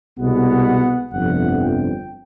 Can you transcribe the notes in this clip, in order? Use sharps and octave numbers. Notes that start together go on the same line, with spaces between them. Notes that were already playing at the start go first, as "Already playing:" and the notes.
C2 B2 G#3 B3 F#5
G1 F2 C3 F3 F#5
G5